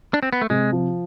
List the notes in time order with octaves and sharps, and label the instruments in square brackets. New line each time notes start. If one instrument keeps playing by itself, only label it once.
[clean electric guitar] D4
C4
B3
A3
[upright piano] C3 [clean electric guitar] G#3
[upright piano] F3